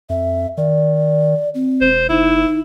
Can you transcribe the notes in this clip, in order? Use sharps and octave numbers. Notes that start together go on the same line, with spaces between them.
F2 E5
D#3 D5
C4
E1 C5
F#1 D#4 E4